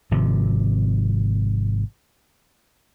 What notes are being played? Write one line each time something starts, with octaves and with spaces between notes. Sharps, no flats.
G#1 C3 F3